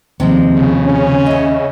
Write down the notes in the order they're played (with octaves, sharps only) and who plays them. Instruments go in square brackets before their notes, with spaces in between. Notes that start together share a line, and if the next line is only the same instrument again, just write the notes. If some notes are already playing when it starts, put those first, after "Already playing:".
[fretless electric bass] D#2 [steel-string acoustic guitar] C3 F3 G#3
[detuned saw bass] C#3
[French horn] C#4
[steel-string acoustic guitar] D#5 E5